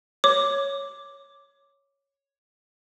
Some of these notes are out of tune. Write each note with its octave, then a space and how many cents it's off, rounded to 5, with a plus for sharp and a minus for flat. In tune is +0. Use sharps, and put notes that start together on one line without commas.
C#5 +0 D6 +0